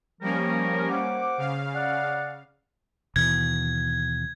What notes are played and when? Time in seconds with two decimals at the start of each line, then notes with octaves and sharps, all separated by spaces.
0.21 F3 G3 A#3 C#4 A#4
0.89 C5 F#5 D6
1.38 C#3 F5
1.74 D5 F#5
3.16 D#2 B2 E3 G#6